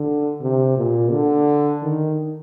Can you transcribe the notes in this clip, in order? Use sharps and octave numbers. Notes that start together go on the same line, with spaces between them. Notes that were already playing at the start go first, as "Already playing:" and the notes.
Already playing: D3
C3
A#2
D3
D#3